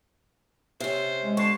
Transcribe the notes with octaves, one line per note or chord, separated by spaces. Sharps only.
C3 C#4 C5
G#3
D3 A5 C#6 C7